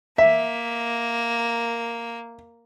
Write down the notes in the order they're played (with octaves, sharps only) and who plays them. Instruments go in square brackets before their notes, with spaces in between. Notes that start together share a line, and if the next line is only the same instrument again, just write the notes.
[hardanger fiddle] A#3 [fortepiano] E5